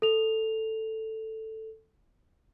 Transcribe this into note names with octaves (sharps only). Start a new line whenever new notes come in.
A4 F7